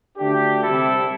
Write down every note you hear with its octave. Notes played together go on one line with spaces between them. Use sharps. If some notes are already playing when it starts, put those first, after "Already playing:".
D2 D3 A3 D4 G4
C2 C3 G3 E4 A4